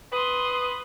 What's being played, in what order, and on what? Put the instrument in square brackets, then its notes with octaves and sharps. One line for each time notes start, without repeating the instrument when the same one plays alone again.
[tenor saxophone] B4 [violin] C6 D#6